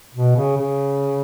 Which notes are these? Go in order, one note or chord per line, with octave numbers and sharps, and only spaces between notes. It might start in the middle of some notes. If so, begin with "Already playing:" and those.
B2
C#3
C#3